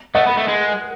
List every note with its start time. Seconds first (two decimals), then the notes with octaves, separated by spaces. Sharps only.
0.15 A3 D#5 F#5
0.26 B3
0.37 A3
0.48 G#3